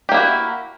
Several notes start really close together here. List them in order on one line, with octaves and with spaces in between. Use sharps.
G4 A#3 E4 F#4